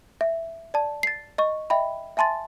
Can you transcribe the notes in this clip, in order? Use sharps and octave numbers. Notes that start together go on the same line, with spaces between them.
E5
D5 A5
A6 C7
D#5 C#6
D#5 E5 G5 B5
E5 G#5 A5 C6 A6